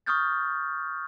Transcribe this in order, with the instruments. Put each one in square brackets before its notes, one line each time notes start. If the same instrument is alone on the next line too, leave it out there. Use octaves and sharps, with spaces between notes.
[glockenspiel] C#6 D#6 F6 G6 A6